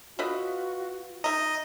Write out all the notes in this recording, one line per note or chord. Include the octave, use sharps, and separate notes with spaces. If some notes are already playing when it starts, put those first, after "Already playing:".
F4 F#4 B4 D#5 E5
D#4 D#5 E5 A#5